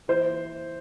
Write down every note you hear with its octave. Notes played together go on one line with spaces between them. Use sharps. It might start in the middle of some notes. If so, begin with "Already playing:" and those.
E3 C5